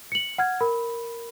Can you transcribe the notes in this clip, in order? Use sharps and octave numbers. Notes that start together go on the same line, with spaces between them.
C#7 F#7
F#5 F6 G#6
A#4 B5